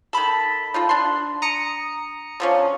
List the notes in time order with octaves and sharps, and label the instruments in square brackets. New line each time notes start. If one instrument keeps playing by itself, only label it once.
[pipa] D#3 A4 [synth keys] A5 B5
[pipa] D#4 F4 A4
D4 C6
[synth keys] A#5 D#6 C#7
[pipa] D3 F3 C#4